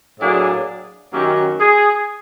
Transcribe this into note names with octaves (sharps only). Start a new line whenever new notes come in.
A2 F#3 A#3 D4 G#4
F#2 D#3 F#3 A#3 C#4 G4
G#4